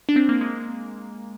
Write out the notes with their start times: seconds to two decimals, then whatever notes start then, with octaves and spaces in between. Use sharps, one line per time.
0.09 D4
0.16 C4
0.29 A#3
0.41 G#3